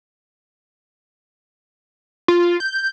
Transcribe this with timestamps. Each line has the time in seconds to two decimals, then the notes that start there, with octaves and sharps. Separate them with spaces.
2.28 F4
2.60 G6